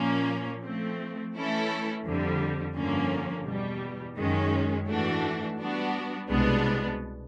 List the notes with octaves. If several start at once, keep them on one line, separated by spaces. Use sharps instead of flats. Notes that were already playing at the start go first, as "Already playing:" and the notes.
Already playing: A#2 F3 A#3 C#4
F3 A3 C4
E3 A3 C#4 E4 A4
F2 D3 G3
G2 D3 F3 A#3 C#4
E2 B2 G3
F#2 D#3 G#3 C#4
G#2 E3 A3 D4 F#4
G3 B3 D4 F#4
C2 B2 G#3 B3 D4